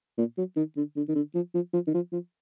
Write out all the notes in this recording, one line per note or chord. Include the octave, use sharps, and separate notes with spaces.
A#2
F#3
D#3
D3
D3
D#3
D3
F3
F3
F3
D#3
F3
F3